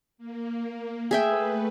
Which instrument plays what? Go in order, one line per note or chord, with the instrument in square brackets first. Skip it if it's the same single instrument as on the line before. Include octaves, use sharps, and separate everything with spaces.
[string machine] A#3
[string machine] A3 B4 [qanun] G#4 E5 G5